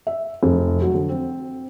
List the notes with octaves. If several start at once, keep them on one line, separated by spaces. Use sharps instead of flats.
E5
F1
F#3
D3
C4